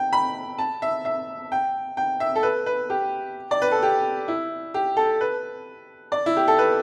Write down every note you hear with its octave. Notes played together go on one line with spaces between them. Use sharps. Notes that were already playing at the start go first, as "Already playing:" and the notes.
Already playing: G5
B5
A5
E5
E5
G5
G5
E5
A4
B4
B4
G4
D5
B4
A4
G4
E4
G4
A4
B4
D5
E4
G4
A4
B4